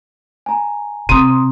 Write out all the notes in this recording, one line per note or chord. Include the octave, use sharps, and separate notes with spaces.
G#5 A#5
C3 C4 A#5 C6 D#6